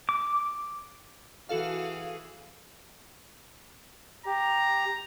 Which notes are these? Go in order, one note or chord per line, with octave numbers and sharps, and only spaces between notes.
D6
E3 F#4 G#4 A4 F5
G4 A#5